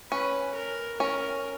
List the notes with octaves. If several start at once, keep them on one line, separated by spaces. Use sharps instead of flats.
C#4 B4
A#4
C#4 A#4